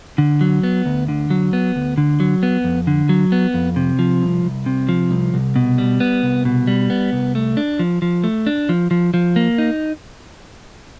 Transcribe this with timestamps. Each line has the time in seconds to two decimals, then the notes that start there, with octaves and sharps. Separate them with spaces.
0.18 D3
0.41 F#3
0.63 B3
0.86 D2
1.08 D3
1.30 F#3
1.53 B3
1.76 D2
1.98 D3
2.20 F#3
2.43 B3
2.64 F2
2.87 D3
3.09 F#3
3.32 B3
3.54 F2
3.76 C3
3.99 F3
4.22 C2
4.44 C2
4.66 C3
4.89 F3
5.11 C2
5.34 C2
5.56 B2
5.78 G3
6.00 B3
6.23 C2
6.45 B2
6.67 G3
6.90 B3
7.13 C2
7.35 A3
7.57 D4
7.79 F3
8.02 F3
8.24 A3
8.47 D4
8.69 F3
8.91 F3
9.14 F3
9.36 A#3
9.58 D#4